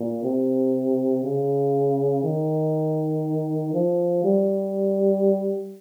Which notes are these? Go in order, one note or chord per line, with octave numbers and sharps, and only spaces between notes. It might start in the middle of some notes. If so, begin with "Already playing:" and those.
Already playing: A#2
C3
C#3
D#3
F3
G3